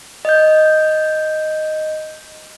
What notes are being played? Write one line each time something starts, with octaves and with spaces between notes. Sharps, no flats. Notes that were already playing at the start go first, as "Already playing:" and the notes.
D#5 G6